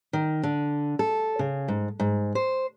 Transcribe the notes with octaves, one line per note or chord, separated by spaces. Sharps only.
D#3
D3
A4
C#3
G#2
G#2
C5